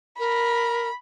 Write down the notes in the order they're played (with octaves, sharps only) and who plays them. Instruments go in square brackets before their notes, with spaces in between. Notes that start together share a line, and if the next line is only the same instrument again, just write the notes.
[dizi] A#4 [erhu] B5